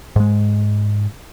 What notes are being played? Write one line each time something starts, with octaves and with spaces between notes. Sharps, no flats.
G#2 G#3